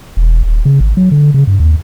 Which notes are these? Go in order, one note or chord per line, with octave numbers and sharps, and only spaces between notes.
E1
D#1
C#3
G#1
F#3
D3
C#3
G2
D#2